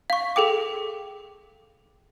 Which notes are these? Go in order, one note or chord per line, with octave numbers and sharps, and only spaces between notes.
F5 C#6
G#4 A4 G5 D6